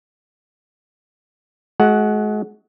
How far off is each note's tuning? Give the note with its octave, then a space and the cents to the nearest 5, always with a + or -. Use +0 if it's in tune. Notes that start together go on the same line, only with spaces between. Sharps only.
G#3 +35 F#4 +0 F#5 +0